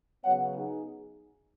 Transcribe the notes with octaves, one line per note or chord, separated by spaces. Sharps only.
C#3 F#3 B3 C#5 F#5
D#4 G#4